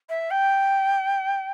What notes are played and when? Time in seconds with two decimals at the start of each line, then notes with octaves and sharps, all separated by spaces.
0.09 E5
0.31 G5